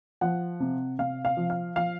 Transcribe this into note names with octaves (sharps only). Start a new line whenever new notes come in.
F3 F#5
C3
C3 F5
F5
F3
F5
F3 F5